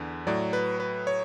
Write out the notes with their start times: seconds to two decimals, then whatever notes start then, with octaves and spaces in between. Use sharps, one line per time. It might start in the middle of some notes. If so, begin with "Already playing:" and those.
Already playing: E2 D3
0.27 A2 F#3 D5
0.53 B4
0.80 B4
1.07 C#5